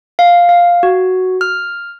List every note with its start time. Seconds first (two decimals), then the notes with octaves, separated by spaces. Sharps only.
0.19 F5
0.49 F5
0.83 F#4
1.41 F6